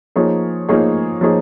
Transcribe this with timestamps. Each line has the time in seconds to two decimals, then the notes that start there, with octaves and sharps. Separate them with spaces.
0.16 F3 A#3 D#4 G#4 C#5
0.69 F3 A#3 D#4 G#4 C#5
1.21 F3 A#3 D#4 G#4 C#5